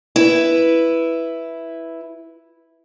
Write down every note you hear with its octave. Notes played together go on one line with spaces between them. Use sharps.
E4 B4